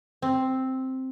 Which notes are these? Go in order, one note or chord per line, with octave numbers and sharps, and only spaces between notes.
C4